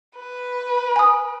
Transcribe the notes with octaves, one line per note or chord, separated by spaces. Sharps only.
B4
G#5 D#6